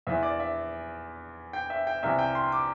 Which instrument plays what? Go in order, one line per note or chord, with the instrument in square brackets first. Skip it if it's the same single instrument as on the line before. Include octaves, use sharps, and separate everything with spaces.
[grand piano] E2 E3 E5
D5
E5
G5
E5
G5
C2 C3 E3 E5
G5
C6
D6